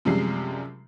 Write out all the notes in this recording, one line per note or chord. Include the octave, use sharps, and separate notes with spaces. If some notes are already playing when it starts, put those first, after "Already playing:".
F#2 C3 F3 G3 G#3 C7